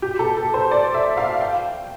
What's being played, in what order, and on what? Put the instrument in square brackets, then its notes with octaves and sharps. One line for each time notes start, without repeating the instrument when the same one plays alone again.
[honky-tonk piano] G4
A4
A4
C5
D5
E5
F5
G5